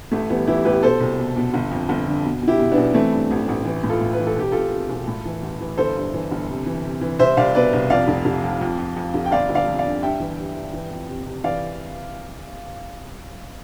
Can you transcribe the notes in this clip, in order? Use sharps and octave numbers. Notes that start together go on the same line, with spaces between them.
A1 A3
E3 G3 B3
E3 E4 G4
A1 G4 B4
B2 A4 C5
C2
B2
B2
G1
F2
G1
D3
B2
B2
E4 G4
B2
B3 D4
B1
E3 A3 C4
G2
A1
A1
E3
A2
F4 A4
A2
B4
E3
A4
E1 G4
E1 F4 A4
C3
E1
A2
E3
A1
E3
G1 A4 C5
G2
E3
G1
C3
E3
C3
E3
C2 C5 E5
C2 D5 F5
B2 B4 D5
C2
F2 D5 F5
F1
F1
F2
F2
F2
F2
F1
G5
G1 D5 F5
G1
D5 F5
F2
D5 F5
D3
G2 E5 G5
E3
G2
G2
E3
F2
C3
C3
E3 D5 F5